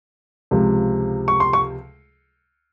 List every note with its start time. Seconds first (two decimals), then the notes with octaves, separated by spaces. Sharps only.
0.51 C#2 C3 F3
1.28 C#6
1.40 C6
1.53 C#6